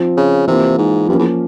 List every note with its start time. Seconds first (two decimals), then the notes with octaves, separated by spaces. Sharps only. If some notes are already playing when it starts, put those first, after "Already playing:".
Already playing: F3 C4 F4
0.17 C#3
0.47 C3 E3 A#3 F4
0.78 G#2
1.09 G2 F3 A#3 C#4
1.19 E2